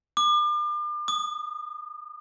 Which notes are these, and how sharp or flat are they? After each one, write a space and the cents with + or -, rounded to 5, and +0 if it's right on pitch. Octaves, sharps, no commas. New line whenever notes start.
D6 +40
D#6 -25